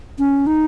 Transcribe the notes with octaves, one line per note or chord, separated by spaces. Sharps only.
C#4
D#4